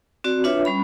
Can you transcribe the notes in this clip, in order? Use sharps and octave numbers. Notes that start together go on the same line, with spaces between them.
C4 F#4 D5
D4 F4 B4 C#5 E5
G3 C#4 B5